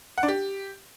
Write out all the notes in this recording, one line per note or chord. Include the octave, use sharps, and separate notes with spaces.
F#5
D4
G4